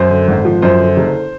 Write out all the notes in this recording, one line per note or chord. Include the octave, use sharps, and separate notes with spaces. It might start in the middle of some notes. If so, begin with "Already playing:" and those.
Already playing: F#2 C5
D3
G#1
F3
F#2 C5
D3
F#1